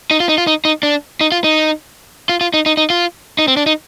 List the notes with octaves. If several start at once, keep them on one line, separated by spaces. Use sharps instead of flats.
D#4
F4
D#4
F4
D#4
D#4
D4
D#4
F4
D#4
F4
F4
D#4
D#4
D#4
F4
D#4
C4
D4
D#4